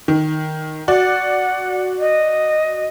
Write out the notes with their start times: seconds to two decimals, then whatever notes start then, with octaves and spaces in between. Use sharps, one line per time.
0.08 D#3
0.88 F#4 D5 F#5
1.99 D#5